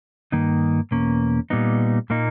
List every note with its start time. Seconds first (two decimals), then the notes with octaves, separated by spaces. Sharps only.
0.32 G2 D#3 A#3 D#4
0.91 E2 B2 A#3 C#4
1.50 A#2 G3 B3 D#4
2.10 A#2 A#3 D#4